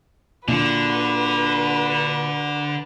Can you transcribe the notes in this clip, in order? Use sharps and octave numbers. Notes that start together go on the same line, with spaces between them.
A#2 D3 D4 F#4 B4